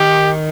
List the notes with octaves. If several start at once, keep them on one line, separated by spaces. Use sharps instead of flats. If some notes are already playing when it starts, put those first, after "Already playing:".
Already playing: D#3 G4